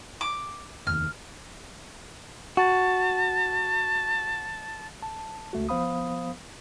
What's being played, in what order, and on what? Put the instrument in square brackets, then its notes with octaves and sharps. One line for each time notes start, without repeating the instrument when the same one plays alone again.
[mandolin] D6
[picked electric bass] F1 D#2 [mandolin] F6
[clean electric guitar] F#4 [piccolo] A5
[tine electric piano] A5
C#2 A3 F#4
F3 B3 C5 F5 B5 D#6